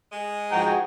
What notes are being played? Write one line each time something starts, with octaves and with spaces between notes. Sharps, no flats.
G#3
G#2 F3 F#4 G#4 G5 A#5